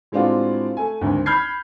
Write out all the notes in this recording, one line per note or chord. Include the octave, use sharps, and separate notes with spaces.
A2 G#3 C4 D4 F4 F#4
A3 G#5
G#1 D2 G2
B5 F6 G6 G#6 C7